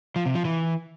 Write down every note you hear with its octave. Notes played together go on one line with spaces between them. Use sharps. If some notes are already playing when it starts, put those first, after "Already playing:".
F3
C3
F3
E3